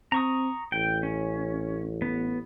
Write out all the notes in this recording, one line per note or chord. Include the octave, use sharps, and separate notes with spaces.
C4 A#5 C#6 D#6
A1 G5
C#4
B3